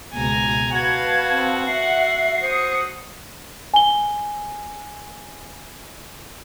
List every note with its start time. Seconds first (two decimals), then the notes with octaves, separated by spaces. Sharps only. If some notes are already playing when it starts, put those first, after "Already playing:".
0.13 C#2 G#2 B2 G#5 A#5
0.75 F#4 B4 F5 A5 G#6
1.31 C4
1.67 E5 F#5 C7
2.41 C5 D#6 C#7
3.74 G#5 G7